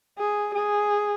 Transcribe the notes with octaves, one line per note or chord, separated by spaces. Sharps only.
G#4
G#4